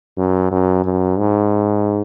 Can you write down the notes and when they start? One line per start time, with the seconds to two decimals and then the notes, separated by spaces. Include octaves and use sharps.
0.17 F#2
0.51 F#2
0.84 F#2
1.19 G#2